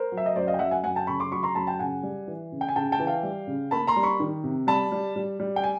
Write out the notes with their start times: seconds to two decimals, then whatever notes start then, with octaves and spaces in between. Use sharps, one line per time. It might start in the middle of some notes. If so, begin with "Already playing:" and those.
Already playing: A#4 C5
0.12 F#3
0.17 E5
0.26 D#5
0.35 F#2 C5 D5
0.47 D#5 F5
0.54 G5
0.59 F#2 E5 F#5
0.71 F#5 G#5
0.84 F#2 F#5 G#5
0.96 G5 A5
1.07 C#3 B5 C#6
1.20 C6 D6
1.31 F#3 B5 C#6
1.43 A#5 C6
1.55 F#2 A5 B5
1.67 G5 A5
1.79 C#3 F#5 G#5
2.03 G3
2.27 E3
2.52 C#3
2.61 G5
2.68 G#5
2.76 C#3 G5 A5
2.92 G5 A5
2.99 E3
3.07 F5 G5
3.23 G3
3.47 C#3
3.71 A#3 A5 B5
3.87 A#5 C6
3.96 G3
4.03 B5 C#6
4.20 D#3
4.44 C3
4.67 G3 A5 B5
4.92 G3
5.16 G3
5.40 G3
5.56 G5
5.64 G#5